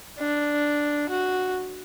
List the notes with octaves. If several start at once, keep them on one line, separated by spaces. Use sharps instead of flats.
D4
F#4